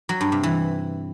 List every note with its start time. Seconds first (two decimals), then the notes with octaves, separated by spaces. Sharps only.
0.09 F#3
0.21 G2
0.32 C3
0.43 E3